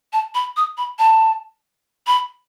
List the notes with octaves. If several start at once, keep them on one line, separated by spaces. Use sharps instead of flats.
A5
B5
D#6
B5
A5
B5